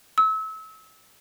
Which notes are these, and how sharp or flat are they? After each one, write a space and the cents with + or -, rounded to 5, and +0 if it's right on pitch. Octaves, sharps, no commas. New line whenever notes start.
E6 -30